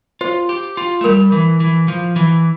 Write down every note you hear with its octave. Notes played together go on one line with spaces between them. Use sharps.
F4 C5
G4
F4
A3
G3 A#4
E3
E3
F3
E3